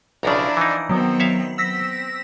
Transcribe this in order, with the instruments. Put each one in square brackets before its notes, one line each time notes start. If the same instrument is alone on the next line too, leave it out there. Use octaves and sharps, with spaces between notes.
[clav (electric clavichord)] B1 C#3 [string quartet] F3 D4 E4 [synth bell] D5 A#5
[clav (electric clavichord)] E3 D#4
[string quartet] D#3 C4 [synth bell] F#3 B3
[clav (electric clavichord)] C#5 E5 F5
[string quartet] C4 [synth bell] E6 A#6 B6